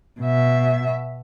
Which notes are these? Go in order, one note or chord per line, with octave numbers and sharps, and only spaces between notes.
B2 E5